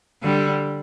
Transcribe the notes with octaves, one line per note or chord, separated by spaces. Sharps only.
D3 G3